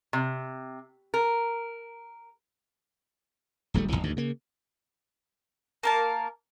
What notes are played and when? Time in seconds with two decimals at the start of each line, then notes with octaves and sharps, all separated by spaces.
0.13 C3
1.14 A#4
3.74 D1 A#1 G3 A3
3.89 F1 C2 F2 E3
4.04 D2 G#2 D#3
4.17 C#3 A#3
5.83 A#3 A#4 A5